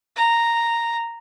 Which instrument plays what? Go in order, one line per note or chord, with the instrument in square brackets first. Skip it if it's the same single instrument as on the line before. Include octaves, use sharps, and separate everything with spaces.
[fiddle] A#5